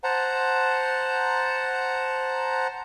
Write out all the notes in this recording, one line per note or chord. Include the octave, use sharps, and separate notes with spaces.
C5 F#5 A5 A#5